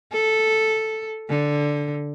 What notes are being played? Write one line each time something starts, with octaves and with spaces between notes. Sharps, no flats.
A4
D3